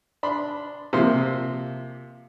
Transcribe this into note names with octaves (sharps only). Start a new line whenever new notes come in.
D4 B5 C6
C3 F3 A#3 C6